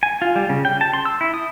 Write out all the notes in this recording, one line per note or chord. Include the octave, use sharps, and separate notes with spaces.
G#5
F4
G3
C#3
G5
A5
C6
E6
E4
D#6